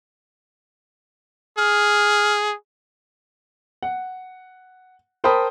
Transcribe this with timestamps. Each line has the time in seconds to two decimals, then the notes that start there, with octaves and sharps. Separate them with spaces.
1.58 G#4 F6
3.83 F#5
5.24 A#4 C5 G5 A5 B5 D#6